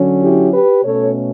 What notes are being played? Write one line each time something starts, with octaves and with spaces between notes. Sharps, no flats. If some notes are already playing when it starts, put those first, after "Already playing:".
Already playing: D3 F#3 C#4
E4 G4
G4 B4
B2 A3 C#4 A4 C#5